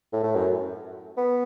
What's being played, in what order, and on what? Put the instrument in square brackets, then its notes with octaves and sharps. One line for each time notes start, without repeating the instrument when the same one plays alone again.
[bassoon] A2
A2
F#2
B3